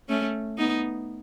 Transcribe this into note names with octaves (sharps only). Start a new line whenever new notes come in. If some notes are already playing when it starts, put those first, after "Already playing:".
A3 C#4
B3 D#4